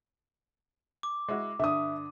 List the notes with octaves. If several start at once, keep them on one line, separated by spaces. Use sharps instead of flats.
D6
G#3 E4 F#4
G2 D3 E5 D#6